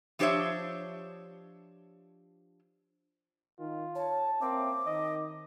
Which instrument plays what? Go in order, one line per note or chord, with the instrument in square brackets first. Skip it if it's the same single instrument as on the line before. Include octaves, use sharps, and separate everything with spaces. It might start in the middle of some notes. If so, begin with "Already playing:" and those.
[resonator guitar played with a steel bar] F3 D4 G4 C5 C#5 E5
[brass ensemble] D#3 [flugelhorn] F4
[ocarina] C#5 [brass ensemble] A5
[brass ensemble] A#3 C#4 E5 [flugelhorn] C4 [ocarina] D6
[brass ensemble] D#3 [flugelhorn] D#5